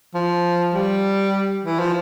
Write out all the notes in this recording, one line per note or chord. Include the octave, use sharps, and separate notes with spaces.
F3
G3
E3
F3